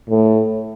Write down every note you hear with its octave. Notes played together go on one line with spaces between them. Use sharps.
A2